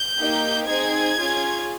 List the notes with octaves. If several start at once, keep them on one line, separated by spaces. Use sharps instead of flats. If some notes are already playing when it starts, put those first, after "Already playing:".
Already playing: G6
A#3 D#4 G4
C4 D#4 G#4 G#6
C#4 F4 G#4